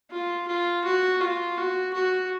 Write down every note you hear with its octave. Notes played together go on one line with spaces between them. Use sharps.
F4
F4
F#4
F4
F#4
F#4